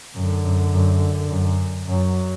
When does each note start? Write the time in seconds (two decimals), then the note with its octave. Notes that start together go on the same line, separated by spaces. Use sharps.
0.14 F#2 D3
0.44 F#2
0.72 F#2
1.30 F#2
1.87 F#2 F#3